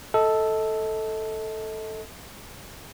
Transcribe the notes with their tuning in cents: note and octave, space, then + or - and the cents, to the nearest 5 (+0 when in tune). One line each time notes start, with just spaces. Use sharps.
A4 +0 D#5 +35